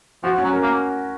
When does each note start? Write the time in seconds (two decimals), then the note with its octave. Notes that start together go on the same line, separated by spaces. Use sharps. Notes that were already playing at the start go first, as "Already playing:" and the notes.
0.23 F3 F#4
0.38 C#4
0.44 F#3
0.53 A#4
0.63 A#3